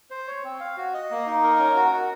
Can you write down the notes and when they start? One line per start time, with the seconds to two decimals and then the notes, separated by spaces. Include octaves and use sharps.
0.10 C5
0.27 C#5
0.44 C4
0.60 F5
0.77 F#4
0.94 D#5
1.11 A#3
1.27 D#4
1.44 A#4
1.59 C#4
1.75 F#4
1.93 F#4